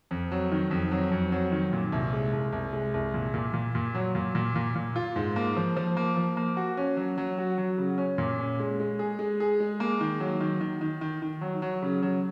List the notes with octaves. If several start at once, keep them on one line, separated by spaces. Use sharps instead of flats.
F2
F#3
D#3
F2
F#3
F2
F#3
D#3
A#2
C2
G#3
C2
C2
G#3
C2
A#2
A#2
A#2
A#2
F#3
A#2
A#2
A#2
A#2
F4
G#2
A#3
F3
F3
A#3
F3
A#3
F#4
C#4
F#3
F#3
F#4
F#3
C#3
C#4
A#2
C#4
G#3
G#3
G#4
G#3
G#4
G#3
A#3
D#3
F#3
D#3
D#3
D#3
D#3
D#3
F#3
F#3
C#3
F#3